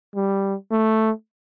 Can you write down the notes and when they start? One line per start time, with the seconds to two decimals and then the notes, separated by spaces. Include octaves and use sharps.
0.15 G3
0.71 A3